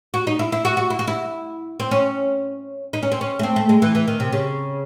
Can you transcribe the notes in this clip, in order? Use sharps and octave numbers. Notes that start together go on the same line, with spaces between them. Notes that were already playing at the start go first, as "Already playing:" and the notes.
F#4
D#4
E4
E4
F#4
F#4
E4
F#4
E4
C4
C#4
D#4
C#4
C4
C#4
A3
C4
A3
G#3
E3
E3
D#3
C3
C#3